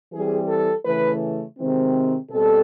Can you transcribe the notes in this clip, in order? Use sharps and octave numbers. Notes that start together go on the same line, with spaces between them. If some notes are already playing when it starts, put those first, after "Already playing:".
E3 G3 C4 G#4
A4
C#3 E3 A3 B4
C3 D#3 G#3 C4
B2 G3 C4 A4